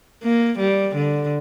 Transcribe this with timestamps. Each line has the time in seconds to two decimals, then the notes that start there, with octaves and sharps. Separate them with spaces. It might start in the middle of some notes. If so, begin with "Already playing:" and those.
0.23 A#3
0.59 G3
0.96 D3